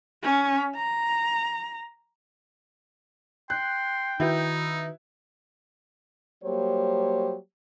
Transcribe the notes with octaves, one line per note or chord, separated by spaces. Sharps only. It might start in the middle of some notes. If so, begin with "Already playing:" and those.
C#4
A#5
G5 C6 F#6
D#3 D#4 E4 F#4 B4
F#3 G3 A#3 G4 C5 C#5